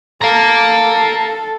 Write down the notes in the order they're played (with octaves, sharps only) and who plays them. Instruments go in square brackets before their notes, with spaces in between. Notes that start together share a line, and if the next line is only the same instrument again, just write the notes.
[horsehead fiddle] A4 [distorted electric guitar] F5 A#5